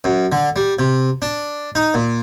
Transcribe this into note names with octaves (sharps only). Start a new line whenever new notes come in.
F#2
D3
G3
C3
D4
D#4
A#2